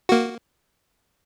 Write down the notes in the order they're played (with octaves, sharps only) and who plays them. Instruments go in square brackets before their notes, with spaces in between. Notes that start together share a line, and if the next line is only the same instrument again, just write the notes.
[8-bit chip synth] A#3 F#4